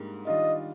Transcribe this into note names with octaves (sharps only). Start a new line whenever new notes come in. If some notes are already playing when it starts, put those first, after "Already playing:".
Already playing: G#2 G3 A#3 D4
D#3 G3 D4 F4 D#5